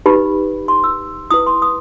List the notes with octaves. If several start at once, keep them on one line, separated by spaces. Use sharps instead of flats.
D#4 G4 B4 B5
C6
E6
E4 B4 D#6
C6
D#6